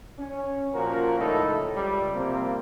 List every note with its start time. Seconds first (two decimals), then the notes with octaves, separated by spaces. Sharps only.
0.19 C#4
0.75 A#2 F3 F#4 A#4
1.20 C#2 A2 D#4 E4 A4
1.75 C#2 G3
2.15 C3 F3 G3 A#3 C4